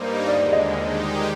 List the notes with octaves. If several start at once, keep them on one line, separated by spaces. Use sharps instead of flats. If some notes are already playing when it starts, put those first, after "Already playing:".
Already playing: G2 G3 A#3 D#4 C5
D#2 D3 G#3 D5
D#5
D#3 G#3 D#4 G4